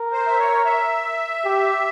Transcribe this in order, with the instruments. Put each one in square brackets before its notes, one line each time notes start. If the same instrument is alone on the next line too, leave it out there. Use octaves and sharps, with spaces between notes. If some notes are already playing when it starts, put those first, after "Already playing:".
Already playing: [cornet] A#4
[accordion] C5
E5
C#5
E5
[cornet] G4